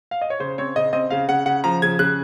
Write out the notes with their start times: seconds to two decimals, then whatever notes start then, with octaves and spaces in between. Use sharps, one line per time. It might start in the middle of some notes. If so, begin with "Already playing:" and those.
0.11 F5
0.21 D#5
0.30 C#5
0.40 C#3 C5
0.58 C4 C#5
0.76 C#3 D#5
0.93 C4 D#5
1.10 C#3 F5
1.29 C#3 F#5
1.46 C#3 F#5
1.64 F3 A#5
1.82 C#3 G#6
1.99 C#3 F#6